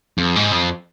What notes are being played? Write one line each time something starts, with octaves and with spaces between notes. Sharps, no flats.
F2
G#2
F2